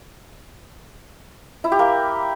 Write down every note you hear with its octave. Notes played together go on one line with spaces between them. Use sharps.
E4
G4
A#3